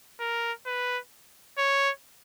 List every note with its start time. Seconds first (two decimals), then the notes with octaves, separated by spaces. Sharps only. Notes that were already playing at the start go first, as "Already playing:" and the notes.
0.20 A#4
0.66 B4
1.58 C#5